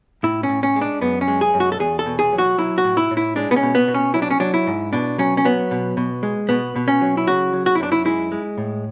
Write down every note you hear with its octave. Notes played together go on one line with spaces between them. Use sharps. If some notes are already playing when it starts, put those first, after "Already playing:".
A2 E4
C#4
A2
C#4
G#3
D4
F#2 B3
C#4
G#3
G#4
F#2
F#4
A4
E2 G#4
A4
B2
G#4
F#3
F#4
F#3 E4
F#4
A2
E4
A2
E4
G#3 D4
B3
C#4
B2
B3
B2
C#4
F#3 E4
D4
C#4
F#3 D4
E4
G#2
B2 D4
F#3 C#4
C#4
F#3 B3
B2
B2
G#3
B2 B3
B2
C#4
F#3
E4
C#3 F#4
F#3
F#4
E4
F#2 D4
E4
G#3 E4
G#3
A2